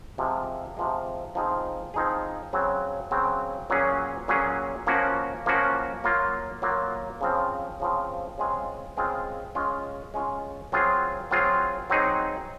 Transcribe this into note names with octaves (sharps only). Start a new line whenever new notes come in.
C3 F3 G#3
C3 F3 G#3
F3 C4 D#4 G#4
F3 C4 D#4 G#4
C#3 F#3 C4
C#3 F#3 C4
A#2 F#3 C#4 G#4
A#2 F#3 C#4 G#4
F3 A#3 C#4 F#4
F3 A#3 C#4 F#4
F#3 A#3 F4
F#3 A#3 F4
C#3 F3 C4
C#3 F3 C4
C#3 G#3 C4 F4 G#4
C#3 G#3 C4 F4 G#4
G#3 C#4 F4
G#3 C#4 F4
F#3 C4 F4 G#4
F#3 C4 F4 G#4
F#3 C4 D#4 G#4